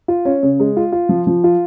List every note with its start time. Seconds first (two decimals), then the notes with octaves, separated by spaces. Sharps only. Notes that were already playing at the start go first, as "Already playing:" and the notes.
0.08 F4
0.25 C#4
0.43 C#3
0.60 G#3
0.77 F4
0.92 F4
1.09 F3
1.27 F3
1.44 F4